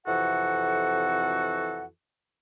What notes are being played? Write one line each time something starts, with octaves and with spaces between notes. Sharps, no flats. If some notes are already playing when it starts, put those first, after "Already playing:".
F2 C3 E3 F#4 A4 F#5